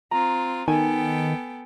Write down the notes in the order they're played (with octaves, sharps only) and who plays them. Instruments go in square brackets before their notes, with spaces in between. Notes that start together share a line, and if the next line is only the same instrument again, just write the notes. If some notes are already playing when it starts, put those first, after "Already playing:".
[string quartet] C4 F4 [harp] A#5
[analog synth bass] D#3 [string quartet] B3 A4 G5 [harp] G#5